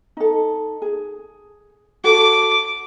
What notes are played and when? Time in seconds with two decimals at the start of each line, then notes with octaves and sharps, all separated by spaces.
0.17 D#4 A4
0.82 G#4
2.04 F#4 A4 D6